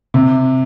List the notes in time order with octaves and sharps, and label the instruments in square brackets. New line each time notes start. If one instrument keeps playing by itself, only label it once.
[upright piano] C3